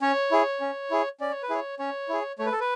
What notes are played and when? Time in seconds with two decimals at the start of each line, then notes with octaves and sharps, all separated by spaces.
0.02 C#4 C#5
0.31 E4 G#4
0.60 C#4
0.91 E4 G#4
1.21 C#4 D5
1.31 C#5
1.43 B4
1.50 E4 G#4 C#5
1.79 C#4 C#5
2.09 E4 G#4
2.39 A3 C#5
2.46 B4
2.52 A4
2.60 B4